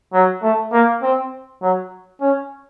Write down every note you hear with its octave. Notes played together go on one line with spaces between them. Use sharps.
F#3
A3
A#3
C4
F#3
C#4